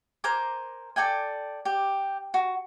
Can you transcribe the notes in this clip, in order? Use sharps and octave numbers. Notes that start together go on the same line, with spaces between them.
A#4 C5 G#5 D6
A4 D5 G5 G#5
G4
F#4